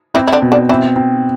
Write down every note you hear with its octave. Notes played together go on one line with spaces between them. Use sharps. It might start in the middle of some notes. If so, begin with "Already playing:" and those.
E3 C4 E4
E4
D3 D4
B2
D3 D4
E3 C4 E4
C4